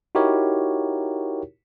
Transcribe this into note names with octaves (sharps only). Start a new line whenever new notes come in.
D#4 E4 F#4 G4 A#4 C#5